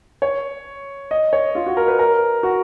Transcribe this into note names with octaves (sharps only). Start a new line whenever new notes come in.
C#5
D#5
C#5
F4
F#4
A#4
B4
A#4
F#4